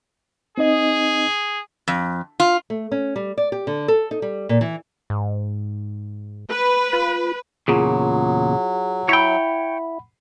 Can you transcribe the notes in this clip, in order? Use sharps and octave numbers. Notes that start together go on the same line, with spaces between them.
C4 D#4 G#4 D#5
F2
F4
A3
C#4
G3
D5
G4
D3
A4
D#4
G3
A#2
E3
G#2
B4
F4
E2 A#2 C#3 F#3 F4 G#4
E4 C#5 F#5 G5 B5